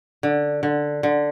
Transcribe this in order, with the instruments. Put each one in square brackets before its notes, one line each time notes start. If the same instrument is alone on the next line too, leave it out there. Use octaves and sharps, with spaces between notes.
[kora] D3
D3
D3